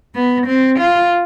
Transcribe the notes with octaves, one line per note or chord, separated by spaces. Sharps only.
B3
C4
F4